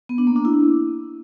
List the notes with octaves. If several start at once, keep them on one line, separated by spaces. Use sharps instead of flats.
B3
D4
A#3
D4
E4